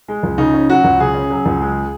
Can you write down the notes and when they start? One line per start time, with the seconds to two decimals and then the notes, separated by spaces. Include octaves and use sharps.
0.08 G#3
0.23 C#2
0.38 C#3 D#4
0.54 C#4
0.69 F#3 F#4
0.84 C#2
0.99 C#3 G#4
1.15 C#4
1.30 F#3
1.46 C#2
1.61 G#3